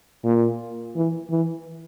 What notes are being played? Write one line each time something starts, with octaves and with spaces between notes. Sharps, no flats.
A#2
E3
E3